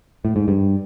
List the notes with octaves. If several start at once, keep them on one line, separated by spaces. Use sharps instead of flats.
A2
G#2
G2